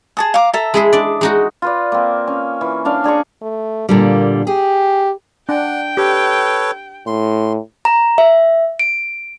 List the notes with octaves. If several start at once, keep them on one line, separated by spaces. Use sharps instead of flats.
G#4 A5 D#6
F5 A#5 D6
A4 E5 A#5
G#3 E4 G#4
D4 D5
G#3 D#4 F#4
F4 B4 D5
A#3 C4
C#4
E3
C#4 D4 F5
D4 G#4 A#5 C#6
A3
A#2 D3 G3 A#3
G4 G#4
D4 F#5 G5
G4 A4 B4 C#5
A2 C6
A#5
E5
D7